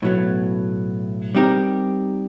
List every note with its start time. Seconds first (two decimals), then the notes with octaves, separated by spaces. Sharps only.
0.02 B1 A2 F#3 B3
1.35 G3 C4 D#4 G4 A#4